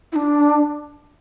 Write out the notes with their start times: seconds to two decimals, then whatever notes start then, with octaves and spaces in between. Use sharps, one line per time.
0.12 E4
0.16 D4